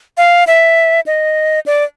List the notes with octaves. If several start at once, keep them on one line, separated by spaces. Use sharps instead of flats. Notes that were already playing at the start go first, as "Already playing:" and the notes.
F5
E5
D#5
D5